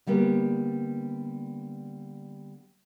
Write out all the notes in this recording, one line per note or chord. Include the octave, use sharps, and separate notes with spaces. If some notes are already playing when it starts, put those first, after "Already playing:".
D3 G3 A#3 B3